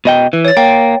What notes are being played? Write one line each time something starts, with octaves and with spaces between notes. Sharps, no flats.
B2 D#5 G5
E3
C#5 A6
A#3 G5